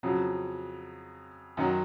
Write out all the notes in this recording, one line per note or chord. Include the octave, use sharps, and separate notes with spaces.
F2 C#3 F#3
F#2 D#3 F#3